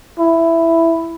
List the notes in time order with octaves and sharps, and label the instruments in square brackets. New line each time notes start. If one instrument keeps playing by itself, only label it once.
[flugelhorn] E4